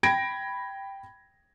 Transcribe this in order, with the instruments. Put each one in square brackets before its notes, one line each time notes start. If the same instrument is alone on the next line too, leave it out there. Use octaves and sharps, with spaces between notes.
[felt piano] G5 B5 G#6 A#6 D7